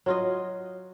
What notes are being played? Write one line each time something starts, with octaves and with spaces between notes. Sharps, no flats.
F#3 F4 D#5